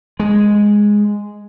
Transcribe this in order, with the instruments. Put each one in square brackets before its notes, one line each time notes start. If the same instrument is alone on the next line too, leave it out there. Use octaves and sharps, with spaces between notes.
[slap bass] G#3